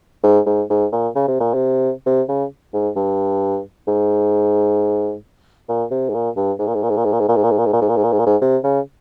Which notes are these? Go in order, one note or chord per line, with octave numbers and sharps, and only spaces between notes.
G#2
G#2
G#2
A#2
C#3
C3
A#2
C3
C3
C#3
G#2
G2
G#2
A#2
C3
G#2
A#2
G2
G#2
A#2
G#2
A#2
G#2
A#2
G#2
A#2
G#2
A#2
G#2
A#2
G#2
A#2
G#2
A#2
G#2
A#2
G#2
A#2
G#2
A#2
G#2
C3
C#3